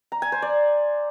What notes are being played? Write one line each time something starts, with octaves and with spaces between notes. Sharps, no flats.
A#5
G#5
C5
D5